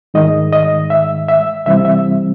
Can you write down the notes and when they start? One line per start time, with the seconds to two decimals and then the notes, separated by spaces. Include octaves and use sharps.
0.14 G#2 D#3 G#3 D#5
0.53 D#5
0.90 E5
1.29 E5
1.66 C2 C3 E3 G3 C4 E5
1.85 E5